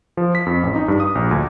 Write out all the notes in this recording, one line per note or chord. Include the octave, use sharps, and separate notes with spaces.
F3
B6
F2
A1
D#4
G2
D#6
A#1
D2